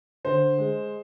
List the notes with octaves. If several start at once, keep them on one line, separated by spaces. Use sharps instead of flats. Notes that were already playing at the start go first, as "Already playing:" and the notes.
D3 C5
G#3